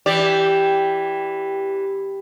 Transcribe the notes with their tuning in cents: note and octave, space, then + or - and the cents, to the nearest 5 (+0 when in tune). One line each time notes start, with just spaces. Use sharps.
E3 +0 G4 +0 D5 -5